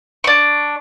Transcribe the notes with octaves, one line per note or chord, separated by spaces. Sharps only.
D4 C#6